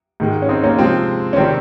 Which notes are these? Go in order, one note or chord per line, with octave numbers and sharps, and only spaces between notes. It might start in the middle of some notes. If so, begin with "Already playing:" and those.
G#2 D#3 G#3
C#4
C4 D#4
A#3 C#4
C3 F3 G#3 C4
C#4
C3 D#3 G3 C4